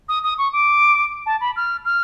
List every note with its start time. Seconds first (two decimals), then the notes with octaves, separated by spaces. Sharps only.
0.08 D#6
0.23 D#6
0.38 C#6
0.52 D6
1.26 A5
1.40 B5
1.56 F6
1.85 F6